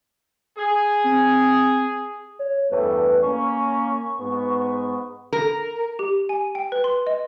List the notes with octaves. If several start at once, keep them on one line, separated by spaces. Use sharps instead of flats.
G#4
C4
C#5
E2 G2 A3 B4
A#3 C#4 C#6
G#2 B3
A#4
G4
G#5
G5
B4
C6
D#5